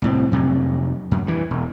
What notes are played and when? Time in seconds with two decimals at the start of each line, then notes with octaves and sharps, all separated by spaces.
0.02 C2 A2 C4
0.32 F2 C3 F#3
1.11 F#2
1.26 G2 E3
1.51 E1